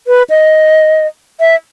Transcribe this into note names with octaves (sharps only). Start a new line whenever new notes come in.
B4
D#5
E5